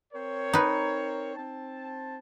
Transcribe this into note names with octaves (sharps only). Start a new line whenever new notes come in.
C4 A#4 C#5
D#4 B4
C4 A5